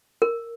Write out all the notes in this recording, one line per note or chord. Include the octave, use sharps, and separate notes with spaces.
A#4